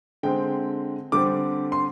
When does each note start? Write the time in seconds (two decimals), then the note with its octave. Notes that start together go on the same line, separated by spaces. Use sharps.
0.23 D3 G#3 C4 G5
1.12 D3 G3 C4 D6
1.72 C6